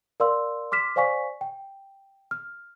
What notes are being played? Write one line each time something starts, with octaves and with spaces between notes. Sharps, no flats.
A#4 D5 F5 C6 E6
C6 D6 F6 B6 E7
C5 D5 F5 G#5 C#6 B6
G5
F6